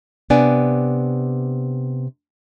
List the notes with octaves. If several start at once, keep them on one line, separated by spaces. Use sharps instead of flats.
C3 B3 D4 D5 G#5